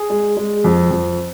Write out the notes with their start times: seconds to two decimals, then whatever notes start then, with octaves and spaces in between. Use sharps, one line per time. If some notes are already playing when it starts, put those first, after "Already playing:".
Already playing: G#4
0.10 G#3
0.37 G#3
0.64 F2
0.91 F2